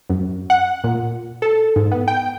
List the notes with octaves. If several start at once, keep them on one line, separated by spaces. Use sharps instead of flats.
F#2
F#5
A#2
A4
G#2
B3
G5